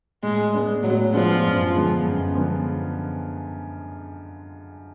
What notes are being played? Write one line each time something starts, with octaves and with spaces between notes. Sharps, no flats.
A2 G#3
G#3 B3 D4
A2 F#3
F3 G#3 B3 D4
F#2
D3 F3 G#3 B3
F#2
D3 F3 G#3 B3